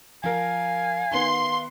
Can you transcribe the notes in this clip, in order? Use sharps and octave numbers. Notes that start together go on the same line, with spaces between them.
F3 A#4 F5 G#5
D#3 B3 C6